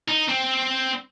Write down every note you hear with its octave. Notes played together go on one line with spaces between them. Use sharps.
D#4
C4